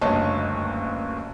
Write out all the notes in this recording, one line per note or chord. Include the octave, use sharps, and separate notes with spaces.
F#1 D2 G2 C#5 D#5 A5